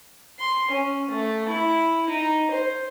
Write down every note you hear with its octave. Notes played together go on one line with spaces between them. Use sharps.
C6
C#4
A3
E4
D#4
C5